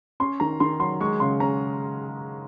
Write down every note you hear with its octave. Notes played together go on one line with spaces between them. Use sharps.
C#4 C6
D#3 A#5
D#3 C6
F#3 C6
G#3 C#6
C#3 C6
C#4 A#5